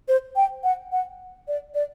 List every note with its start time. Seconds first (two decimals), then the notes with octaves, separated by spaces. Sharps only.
0.08 C5
0.36 G5
0.64 F#5
0.92 F#5
1.48 D5
1.74 D5